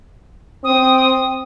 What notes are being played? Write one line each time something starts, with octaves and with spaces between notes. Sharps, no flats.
C4 D#6